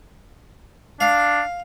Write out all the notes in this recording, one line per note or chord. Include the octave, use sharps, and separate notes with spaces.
D4 F5